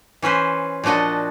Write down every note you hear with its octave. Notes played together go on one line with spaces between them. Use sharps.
E3 C#4 B4 C5
A#2 F3 D4 F#4 D#5